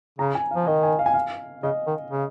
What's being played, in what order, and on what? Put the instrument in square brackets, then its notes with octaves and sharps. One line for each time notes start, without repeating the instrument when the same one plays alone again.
[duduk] C#3 [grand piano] A#5
[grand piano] G#5
F5
[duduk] F3
[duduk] D#3 [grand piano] D#5
[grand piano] G#5
F5
G#5
F5
[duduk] C#3 [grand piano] D#5
[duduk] D#3
C#3